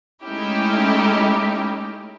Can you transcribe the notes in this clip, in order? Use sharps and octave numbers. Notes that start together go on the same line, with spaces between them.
G#3 A3 C#4 D#4 E4 G4